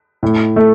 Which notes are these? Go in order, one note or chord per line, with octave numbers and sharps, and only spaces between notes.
A2
A3